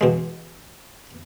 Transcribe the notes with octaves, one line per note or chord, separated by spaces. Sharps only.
E2 B2 G#3